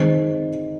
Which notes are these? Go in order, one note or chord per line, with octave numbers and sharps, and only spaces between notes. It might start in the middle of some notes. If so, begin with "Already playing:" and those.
Already playing: D#3 G#3 C4 D#4